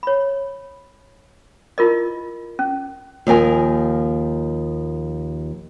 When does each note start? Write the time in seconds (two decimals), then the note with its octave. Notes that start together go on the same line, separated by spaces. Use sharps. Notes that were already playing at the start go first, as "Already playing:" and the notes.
0.03 C#5 B5
1.78 E4 F4 A#4 D#5
2.59 C#4
3.27 D#2 F3 A#4 G#5